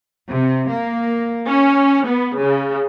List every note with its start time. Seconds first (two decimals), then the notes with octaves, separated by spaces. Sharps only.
0.30 C3
0.68 A#3
1.47 C#4
2.08 B3
2.38 C#3